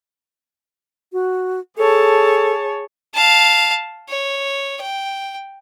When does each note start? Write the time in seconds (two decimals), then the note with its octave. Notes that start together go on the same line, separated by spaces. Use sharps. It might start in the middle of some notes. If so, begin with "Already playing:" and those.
1.13 F#4
1.77 G#4 A4 C#5 A5
3.14 F5 A5
4.09 C#5
4.81 G5